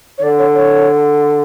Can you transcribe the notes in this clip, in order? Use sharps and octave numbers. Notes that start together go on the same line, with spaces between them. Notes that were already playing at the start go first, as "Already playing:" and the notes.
C#5
D3 D5
C#5
C#5